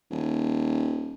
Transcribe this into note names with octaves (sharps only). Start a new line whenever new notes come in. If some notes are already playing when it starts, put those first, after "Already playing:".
D#1